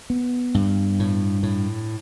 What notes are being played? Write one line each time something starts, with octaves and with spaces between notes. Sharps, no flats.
B3
G2
A2
A2